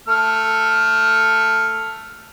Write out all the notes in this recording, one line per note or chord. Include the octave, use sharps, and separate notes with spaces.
A3 F6